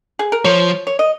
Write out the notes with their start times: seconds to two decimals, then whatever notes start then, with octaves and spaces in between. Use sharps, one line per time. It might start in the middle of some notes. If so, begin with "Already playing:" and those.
0.19 G#4
0.32 A#4
0.45 F3 C#5
0.87 C#5
0.99 D#5